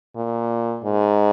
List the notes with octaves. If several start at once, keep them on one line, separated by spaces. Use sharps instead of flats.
A#2
G#2